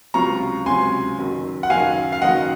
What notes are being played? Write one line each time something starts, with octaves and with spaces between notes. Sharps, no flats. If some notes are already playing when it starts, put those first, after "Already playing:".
C#2 C3 F#3 C#4 F4 A#5 C#6
C#2 C3 F#3 C#4 F4 G#5 C6
F#1 F#2 D#3 F#3
F#5
F#1 F#2 D#3 F#3 F5 G#5
F5
F#1 F#2 D#3 F#3 D#5 F#5